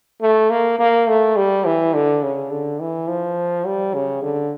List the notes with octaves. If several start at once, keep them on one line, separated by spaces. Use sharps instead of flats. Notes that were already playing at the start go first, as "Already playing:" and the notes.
A3
A#3
A#3
A3
G3
E3
D3
C#3
D3
E3
F3
G3
C#3
D3